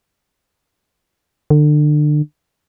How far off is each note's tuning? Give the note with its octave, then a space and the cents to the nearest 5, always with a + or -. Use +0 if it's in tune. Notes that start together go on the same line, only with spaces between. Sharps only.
D3 +30